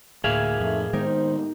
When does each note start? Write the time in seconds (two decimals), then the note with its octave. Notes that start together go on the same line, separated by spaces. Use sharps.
0.24 D2 A2 A#3 G#4 E5 F5 G#6
0.60 F2 A3 D#4
0.93 D#3 G#3 B3 D#4 G4 A#4 C5